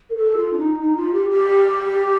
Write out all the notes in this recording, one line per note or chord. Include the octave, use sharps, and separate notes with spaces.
A#4
A4
F4
D4
D#4
D#4
F4
G4
G4